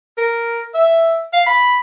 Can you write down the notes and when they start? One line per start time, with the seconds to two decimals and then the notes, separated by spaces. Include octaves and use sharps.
0.18 A#4
0.75 E5
1.33 F5
1.46 B5